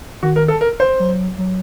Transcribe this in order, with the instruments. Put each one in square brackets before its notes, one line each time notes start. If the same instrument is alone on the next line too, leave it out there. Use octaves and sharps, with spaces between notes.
[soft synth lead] D#3 [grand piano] F#4
[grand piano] A#4
A4
A#4
C5
[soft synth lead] F#3
F#3